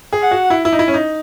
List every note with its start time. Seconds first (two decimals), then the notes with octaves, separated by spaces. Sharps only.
0.13 G#4
0.22 F#5
0.31 F#4
0.50 E4
0.65 E4
0.73 D#4
0.79 E4
0.88 C#4
0.94 D#4